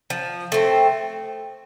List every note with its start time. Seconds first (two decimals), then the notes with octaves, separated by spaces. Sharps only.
0.10 F3
0.52 A3 C4